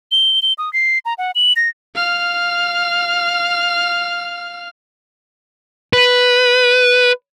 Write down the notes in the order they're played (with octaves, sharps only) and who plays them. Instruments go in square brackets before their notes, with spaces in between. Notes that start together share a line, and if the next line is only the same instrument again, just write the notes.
[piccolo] G7
G7
D#6
C7
A#5
F#5
F#7
A#6
[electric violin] F5 F6
[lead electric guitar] B4